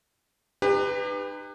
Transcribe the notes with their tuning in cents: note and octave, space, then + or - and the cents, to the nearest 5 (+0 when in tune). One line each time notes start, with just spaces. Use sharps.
D#4 -35 G4 +35 B4 +10